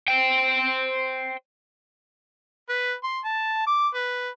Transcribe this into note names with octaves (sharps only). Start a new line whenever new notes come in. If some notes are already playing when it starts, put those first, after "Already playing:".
C5 G5
B4
C6
A5
D6
B4